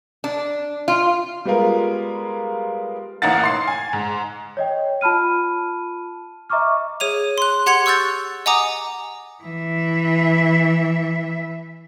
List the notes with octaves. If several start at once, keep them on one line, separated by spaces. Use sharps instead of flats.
D4
F4
G3 G#3 B3 F4 A#4
A1 A#3 D#4 A#4 F#5 A6
C6 C7
G#5
G#2
C#5 D#5 G5
F4 A5 B5 F6 D#7
D#5 E5 A#5 C#6 D6 F6
G#4 C#5 D#7 F7
C6 F#6
G4 F#5 C6 G#6 C#7 F7
C#6 E6 F#6 G6 A6
D#5 F#5 G#5 A#5 D6 D#6
E3 E5